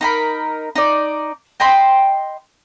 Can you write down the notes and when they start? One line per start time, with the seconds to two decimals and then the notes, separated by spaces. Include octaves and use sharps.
0.01 D#4 A#4 B5
0.75 D#4 D5
1.60 D#5 G5 B5 C6